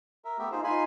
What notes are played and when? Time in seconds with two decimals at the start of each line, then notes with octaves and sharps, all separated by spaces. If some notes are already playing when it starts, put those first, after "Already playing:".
0.25 A#4 E5
0.38 A3 B3 G4 E5
0.52 D#4 F4 G#4 C5
0.64 D#4 F4 G#5 B5 C6